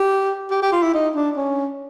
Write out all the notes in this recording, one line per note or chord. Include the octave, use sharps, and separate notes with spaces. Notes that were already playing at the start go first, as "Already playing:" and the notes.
Already playing: G4
G4
G4
F4
E4
D#4
D4
C#4